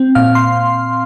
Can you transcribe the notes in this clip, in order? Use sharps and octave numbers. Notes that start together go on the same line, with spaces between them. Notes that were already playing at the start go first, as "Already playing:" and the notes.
Already playing: C4
A#2 F5 F6
C6